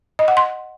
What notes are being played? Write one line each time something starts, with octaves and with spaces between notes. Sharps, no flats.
D#5
F#5
C6